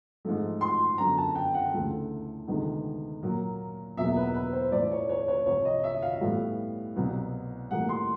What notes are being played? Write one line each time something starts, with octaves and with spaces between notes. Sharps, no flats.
G#2 F3 A3
C6
F#2 D3 F#3 B3 A#5
A5
G5
F#5
D2 C#3 E3 A3
D2 C3 D#3 G#3 B3
A#2 F#3 A#3
E2 B2 F#3 A#3 E5
B4
B4
C5
A2 E3 A3 D5
C#5
C#5
C#5
C2 C3 F3 C#5
D#5
E5
F5
A2 E3 G3 B3
C2 B2 F#3 B3
A2 E3 G3 A#3 F#5
C6